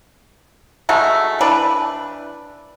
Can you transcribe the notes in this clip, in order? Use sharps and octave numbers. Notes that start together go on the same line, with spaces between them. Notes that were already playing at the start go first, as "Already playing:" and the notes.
G#3 A3 D#4 F#4
E3 D4 B4